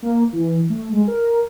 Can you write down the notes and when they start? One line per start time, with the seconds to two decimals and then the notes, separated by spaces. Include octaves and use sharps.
0.02 A#3
0.33 E3
0.70 A3
0.93 G#3
1.08 A#4